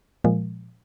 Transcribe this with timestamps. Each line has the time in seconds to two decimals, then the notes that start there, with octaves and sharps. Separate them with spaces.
0.24 A#2 F3 G#3